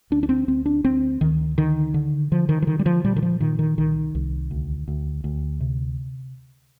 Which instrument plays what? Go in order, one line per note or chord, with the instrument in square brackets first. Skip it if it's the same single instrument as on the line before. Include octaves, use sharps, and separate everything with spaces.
[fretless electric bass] D2 D4
D4
C4
D2 C4
D4
D2 C4
D2 D#3
D3 D#3
D3
D3 F3
D#3
F3
D3 D#3
G3
F3
A#2 G3
D#3
F3
A#2 D#3
D#3
C2 D#3
C2
D2
D2
D2
C3